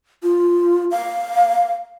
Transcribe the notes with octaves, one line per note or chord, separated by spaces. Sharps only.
F4
F5